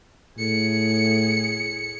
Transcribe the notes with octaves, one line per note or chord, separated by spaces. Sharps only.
A2 G#4 C#7